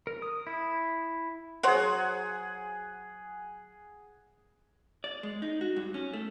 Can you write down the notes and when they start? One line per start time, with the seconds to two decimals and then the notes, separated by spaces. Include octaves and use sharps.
0.07 A#4
0.22 D#6
0.47 E4
1.63 F#3 G#4 C5 C#5 F#5
5.04 D5
5.23 G#3
5.42 D#4
5.61 F#4
5.76 G2
5.94 C#4
6.13 A3